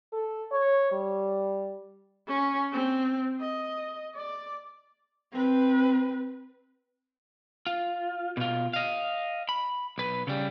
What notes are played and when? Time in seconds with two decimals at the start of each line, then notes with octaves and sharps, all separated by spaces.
0.12 A4
0.52 C#5
0.91 G3
2.28 C#4
2.73 C4
3.41 D#5
4.16 D5
5.32 C4 B4
7.67 F4
8.37 B2 F4
8.73 D#5 F5
9.49 B5
9.98 B1 B4
10.27 C#3 G3